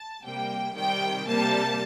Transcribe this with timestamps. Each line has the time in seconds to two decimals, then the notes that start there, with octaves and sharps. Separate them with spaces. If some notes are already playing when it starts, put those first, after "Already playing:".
Already playing: A5
0.24 C3 G3 A#3 G5
0.75 C3 D#3 G3 G5
1.26 C3 G3 A#3 A5